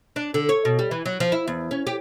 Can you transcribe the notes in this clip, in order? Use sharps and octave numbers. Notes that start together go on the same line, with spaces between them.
D4
D3
C#5
B2
G3
E3
F#3
F3
E4
E2
C#4
G4